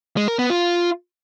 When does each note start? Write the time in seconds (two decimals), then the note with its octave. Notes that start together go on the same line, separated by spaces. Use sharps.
0.17 G#3
0.28 A#4
0.39 B3
0.50 F4